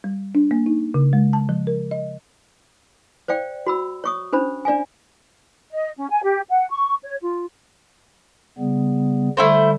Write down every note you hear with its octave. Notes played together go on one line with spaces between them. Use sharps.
G3
D4
A#3
D#4
C#3
G#3
A5
F3
A#4
D#5
C5 D5 F5 G5
F#4 B5 E6
C#5 C#6 D#6
C#4 D4 C5 B5
D4 D5 F5 G#5
D#5
C#4
G#5
G4
F#5
C#6
C#5
F4
C#3 G3 B3
D3 G3 A3 E4 C5